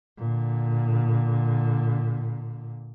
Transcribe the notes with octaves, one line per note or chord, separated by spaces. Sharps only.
A#2 D3